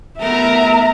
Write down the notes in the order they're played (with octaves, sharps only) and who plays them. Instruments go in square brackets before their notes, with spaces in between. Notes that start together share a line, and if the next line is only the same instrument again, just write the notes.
[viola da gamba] A3 B3 A#4 [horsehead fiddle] E5 A#5